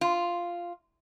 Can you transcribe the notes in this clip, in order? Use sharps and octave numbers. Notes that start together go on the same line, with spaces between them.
F4